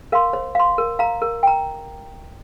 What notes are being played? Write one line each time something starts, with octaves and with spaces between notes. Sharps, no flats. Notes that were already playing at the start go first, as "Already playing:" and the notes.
A#4 F5 C6
C5
F5 C6
A#4
F5 A#5
A#4
G5 A#5